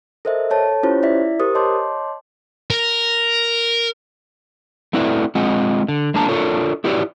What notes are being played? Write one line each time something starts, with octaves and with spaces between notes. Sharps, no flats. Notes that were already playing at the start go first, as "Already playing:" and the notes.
A4 A#4 C5 D#5 E5
A4 C#5 A5
C#4 E4 F4 G4 C5 C#5
E4 D5 E5 B6
G4 A#4 C5 D#6
C#5 D#5 A5 C6 D6 G6
A#4
A3 C4 E4 F#4 B4 D5
G#3 C4 F4 D#5 F#5
D3
G#3 A#3 D4 A5 A#5
D4 F4 A4 A#4 C#5
E4 F#4 G4 B4 C#5 D5